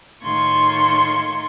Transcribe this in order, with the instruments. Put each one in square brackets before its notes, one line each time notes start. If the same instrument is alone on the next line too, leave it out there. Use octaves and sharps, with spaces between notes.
[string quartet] A2 D#3 F4 C6 C#6 G#6